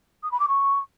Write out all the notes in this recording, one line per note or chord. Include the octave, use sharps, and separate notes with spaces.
D#6
B5
D6
C#6